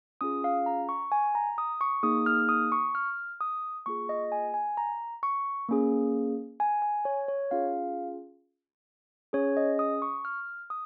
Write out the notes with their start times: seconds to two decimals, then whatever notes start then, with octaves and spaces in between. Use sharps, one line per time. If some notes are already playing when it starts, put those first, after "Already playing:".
0.21 C#4 F4 G#4 D#6
0.44 F5
0.66 A#5
0.89 C#6
1.12 G#5
1.35 A#5
1.58 D#6
1.81 C#6
2.03 A#3 D#4 G#4 D#6
2.26 F6
2.49 D#6
2.72 C#6
2.95 F6
3.41 D#6
3.86 A#3 F4 G#4 C#6
4.09 D#5
4.32 G#5
4.54 G#5
4.77 A#5
5.23 C#6
5.69 A#3 C#4 G#4
6.60 G#5
6.82 G#5
7.05 C#5
7.28 C#5
7.51 C#4 F4 G#4 F5
9.33 C#4 G#4 C#5
9.57 D#5
9.79 D#6
10.02 C#6
10.25 F6
10.70 D#6